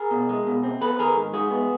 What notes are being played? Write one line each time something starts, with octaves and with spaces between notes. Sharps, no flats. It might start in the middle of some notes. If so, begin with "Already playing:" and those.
Already playing: G#4 A#4
B2
G#3
B2
C4
B3 A4 B4
D#3 G#4 A#4
G#2
G#3 F#4 G#4
B3